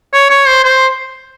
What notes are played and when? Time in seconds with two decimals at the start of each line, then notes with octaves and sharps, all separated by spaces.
0.13 C#5
0.30 C#5
0.47 C5
0.64 C5